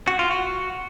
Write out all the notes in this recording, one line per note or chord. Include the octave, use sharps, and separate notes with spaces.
F#4
F4
F#4